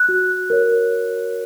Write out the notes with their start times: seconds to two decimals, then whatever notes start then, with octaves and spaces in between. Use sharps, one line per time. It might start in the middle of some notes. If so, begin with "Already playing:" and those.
Already playing: F#6
0.09 F#4
0.50 A#4 C#5